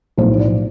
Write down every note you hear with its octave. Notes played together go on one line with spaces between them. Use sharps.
B1 A2 F3 B3 C5
D5